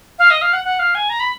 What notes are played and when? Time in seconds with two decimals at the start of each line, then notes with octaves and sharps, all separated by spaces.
0.19 F5
0.31 D#5
0.42 F5
0.53 F#5
0.65 F#5
0.79 F5
0.95 G#5
1.10 A#5
1.20 B5